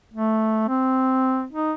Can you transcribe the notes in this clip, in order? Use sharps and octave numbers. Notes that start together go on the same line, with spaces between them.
A3
C4
D#4